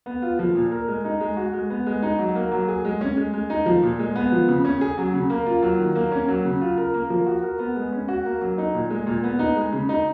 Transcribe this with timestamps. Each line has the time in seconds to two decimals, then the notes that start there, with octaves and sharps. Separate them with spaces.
0.06 B3
0.22 F4
0.39 F3
0.55 A#2
0.71 A#4
0.88 G#3
1.05 D#4
1.21 G#3
1.37 F#4
1.53 G#3
1.70 B3
1.86 G#3
2.02 D#4
2.19 F#3
2.35 A#3
2.52 F#3
2.68 G#4
2.85 G#3
3.01 C#4
3.17 G#3
3.33 G#3
3.50 D#4
3.66 F3
3.83 A#2
3.99 G#3
4.15 B3
4.32 F3
4.48 C#3
4.65 C#4
4.81 G#4
4.98 F#3
5.14 C#3
5.30 A#3
5.46 F4
5.63 F#3
5.79 D#3
5.96 A#3
6.12 C#4
6.28 F#3
6.45 C#3
6.61 F4
6.78 A#4
6.94 A#3
7.10 F3
7.26 F#4
7.43 A#4
7.59 B3
7.76 G#3
7.92 C#4
8.08 F#4
8.25 A#3
8.41 F#3
8.58 D#4
8.74 A#2
8.90 G#3
9.07 A#2
9.24 B3
9.39 D#4
9.56 G#3
9.72 C#3
9.89 D#4